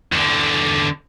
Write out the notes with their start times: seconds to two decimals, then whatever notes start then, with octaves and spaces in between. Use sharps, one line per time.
0.12 E2 D3